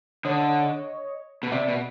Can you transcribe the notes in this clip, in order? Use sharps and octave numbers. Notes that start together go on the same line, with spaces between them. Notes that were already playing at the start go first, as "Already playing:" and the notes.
D3 C#5 D#5
B2
C3 D5 E5
B2